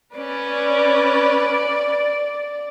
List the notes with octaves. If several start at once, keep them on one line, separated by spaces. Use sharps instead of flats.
C#4 B4 D5